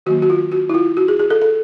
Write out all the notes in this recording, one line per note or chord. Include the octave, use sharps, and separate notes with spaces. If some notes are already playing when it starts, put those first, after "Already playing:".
D#3 F#3 A#3 F#4
F#4
F4
F#4
E4
F4
F#4
G#4
G#4
A4
A4